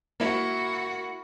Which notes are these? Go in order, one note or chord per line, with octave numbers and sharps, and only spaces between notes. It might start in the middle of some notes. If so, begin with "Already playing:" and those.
A#3 E4 F#4